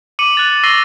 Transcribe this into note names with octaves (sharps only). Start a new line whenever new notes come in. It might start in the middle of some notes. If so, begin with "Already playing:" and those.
D6 C#7 D#7 F#7
F#6 A6 F7
C#6 E6 A#6 C7 D#7 G7